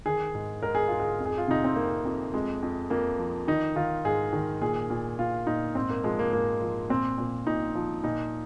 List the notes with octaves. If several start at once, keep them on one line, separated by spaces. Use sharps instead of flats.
D#3 G#4
G#2
G#2 A#4
G#4
G#2 F4
G#4
F2
G#4
F4
C3 D#4
C4
F2 A#3
F2
F2 G#3
F2
F2 A#3
F3
D#3 D#4
D#3 F4
G#2 G#4
D#3
A#2 G#4
A#2
A#2 F4
A#2 D#4
G#2 C4
A#3
F3 G#3
A#3
G#2 A#3
F3
A#2 C4
A#2
A#2 D#4
F3
A#2 D#4